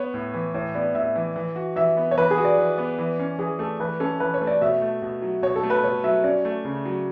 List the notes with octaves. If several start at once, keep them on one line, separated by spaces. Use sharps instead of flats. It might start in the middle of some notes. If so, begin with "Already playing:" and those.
Already playing: B3 C#5
A2
E3
A2 C#5
B3 D5
A2 E5
E3
E3
F#4
E3 E5
B3
C#5
E3 B4
G#4
F#4
D5
E3
B3
E3
C#4
E3 G#4
A3 A4
E3 B4
C#4 A4
E3 B4
C#5
A3
D5
B2 E5
A3
B2
F#3
B2 C#5
A4
A3
B4
B2 C#5
F#3 E5
C#4 D5
A3
C#3
F#3